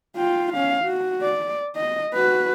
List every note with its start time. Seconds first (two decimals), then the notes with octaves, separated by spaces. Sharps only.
0.17 F4 G5
0.53 C#4 F5
0.85 F#4
1.22 D5
1.76 D#5
2.14 F#4 B4